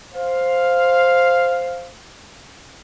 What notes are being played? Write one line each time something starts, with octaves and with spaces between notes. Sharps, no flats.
C5 F5